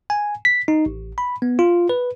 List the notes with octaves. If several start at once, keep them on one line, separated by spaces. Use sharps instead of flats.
G#5
B6
D#4
A1
B5
B3
F4
B4